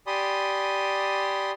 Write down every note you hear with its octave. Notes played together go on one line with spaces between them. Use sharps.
G4 D5 G#5 B5 C6 D#6